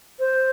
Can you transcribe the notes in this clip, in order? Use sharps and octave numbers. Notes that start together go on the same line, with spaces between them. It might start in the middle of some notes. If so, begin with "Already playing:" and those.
C5